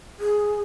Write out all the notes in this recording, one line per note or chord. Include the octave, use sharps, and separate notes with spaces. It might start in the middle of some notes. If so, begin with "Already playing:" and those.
G#4